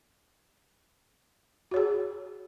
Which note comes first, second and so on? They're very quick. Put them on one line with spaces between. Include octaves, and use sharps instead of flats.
F#4 C#5 G#4